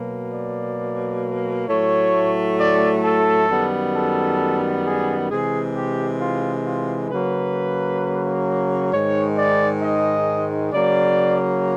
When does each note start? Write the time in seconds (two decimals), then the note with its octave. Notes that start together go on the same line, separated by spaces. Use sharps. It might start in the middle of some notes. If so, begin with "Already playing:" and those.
Already playing: B2 F#3 A#3
0.33 D5
1.68 A2 F#3 A3 C#5
2.59 D5
3.04 A4
3.49 F#2 D#3 G3 B3
3.95 A4
4.85 G#4
5.30 C3 E3 G#3 G#4
5.75 G4
6.21 F4
6.65 F4
7.10 C#3 F#3 A#3 B4
8.92 G#2 D#3 G#3 C#5
9.37 D5
9.82 D#5
10.73 C#3 F#3 A#3 D5